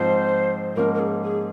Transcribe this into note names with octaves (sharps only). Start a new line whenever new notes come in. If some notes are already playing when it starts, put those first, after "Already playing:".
Already playing: G#2 F3 C4 C5
G#2 F3 A#3 C#4 A#4
A#4
G#4
G#4